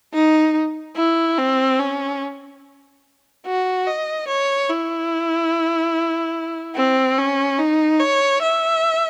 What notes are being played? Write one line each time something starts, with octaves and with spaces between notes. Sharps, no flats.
D#4
E4
C4
C#4
F#4
D#5
C#5
E4
C4
C#4
D#4
C#5
E5